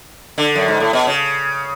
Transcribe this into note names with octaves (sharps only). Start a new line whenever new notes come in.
D3
F#2
G#2
A2
B2
C#3